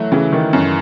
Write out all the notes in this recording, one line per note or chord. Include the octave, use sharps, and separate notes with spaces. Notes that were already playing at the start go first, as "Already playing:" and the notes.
Already playing: E3 F#3 A3
C#3 E3
D#3
F#2